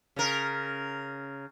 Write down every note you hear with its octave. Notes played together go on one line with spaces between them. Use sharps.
C#3 A#4